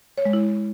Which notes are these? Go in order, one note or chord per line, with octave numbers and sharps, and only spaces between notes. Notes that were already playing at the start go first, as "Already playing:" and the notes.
C#5
G#3
E4